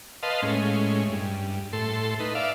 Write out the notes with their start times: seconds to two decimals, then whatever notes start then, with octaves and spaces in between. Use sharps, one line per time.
0.23 B4 D#5 F5 A5 C6
0.43 A2 G#3 C#4
1.09 G2
1.73 A2 A4 C6
2.20 D#4 B4
2.35 D5 E5 F5